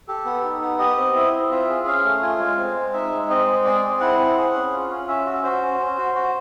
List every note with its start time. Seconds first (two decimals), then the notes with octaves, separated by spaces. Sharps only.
0.08 G4 A4
0.25 B3
0.44 D#4
0.62 B3
0.79 G4 D#5
0.97 C4
1.15 E4
1.33 C4
1.51 F4 E5
1.69 G#4
1.86 C#4 F5
2.04 A3
2.22 F4 G#5
2.40 G#3
2.57 C4
2.75 G#3
2.93 D#4 E5
3.12 G#3
3.30 C4 D#5
3.47 G#3
3.65 G#4 D5
3.83 C4
4.00 E4 F#5
4.19 C4
4.37 G#4
4.54 C#4
4.72 F4
4.90 C#4
5.08 C#4 E5
5.26 F#4
5.43 F#4 C5
5.61 C#4
5.80 C#4
5.98 F#4
6.15 F#4